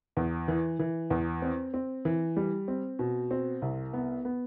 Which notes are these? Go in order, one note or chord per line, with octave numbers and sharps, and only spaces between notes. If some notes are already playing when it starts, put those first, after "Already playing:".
E2
E3
E3
E2
C4
C4
E3
G3
C4
B2
C4
C2
B3
B3